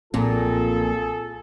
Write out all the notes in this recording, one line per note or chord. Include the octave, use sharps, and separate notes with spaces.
B1 A#2 F3 C4 F4 G#4 A4